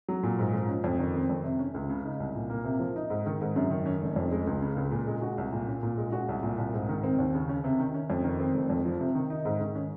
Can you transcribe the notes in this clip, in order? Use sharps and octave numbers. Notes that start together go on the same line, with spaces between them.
F#3
A#2
G#2
F3
C#4
F2
D#3
C4
F2
C3
C#4
C#2
C#3
D#4
C2
A#2
A#3
C3
F3
D#4
G#2
D#3
G#2
F#2
D#3
C#4
F1
F2
G#3
C#2
C#3
C#2
A#2
G#3
F#4
C2
A#2
C#4
A#2
G#3
F#4
C2
A#2
C2
G#2
D#3
C4
D#2
C#3
C#4
C3
D#3
C#4
F2
D#3
C4
F1
F2
F3
C3
D#3
D#4
G#2
D#3
C#4